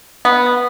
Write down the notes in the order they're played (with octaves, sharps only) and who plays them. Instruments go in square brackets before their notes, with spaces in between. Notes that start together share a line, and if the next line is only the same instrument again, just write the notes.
[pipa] B3